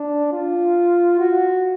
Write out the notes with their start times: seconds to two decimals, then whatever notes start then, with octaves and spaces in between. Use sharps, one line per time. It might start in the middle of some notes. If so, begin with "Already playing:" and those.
Already playing: D4
0.32 F4
1.19 F#4